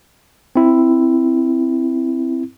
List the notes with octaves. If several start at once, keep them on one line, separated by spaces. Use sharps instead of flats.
C4 E4